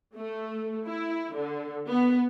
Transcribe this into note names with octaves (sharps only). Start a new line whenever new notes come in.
A3
E4
D3
B3